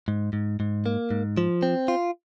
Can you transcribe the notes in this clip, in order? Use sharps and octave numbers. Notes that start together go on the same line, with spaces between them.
G#2
G#2
G#2
A#3
G#2
F3
C4
F4